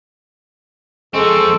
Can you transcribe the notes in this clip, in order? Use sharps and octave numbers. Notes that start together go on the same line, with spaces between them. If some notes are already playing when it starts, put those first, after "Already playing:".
F3 G#3 C4 A4 C#6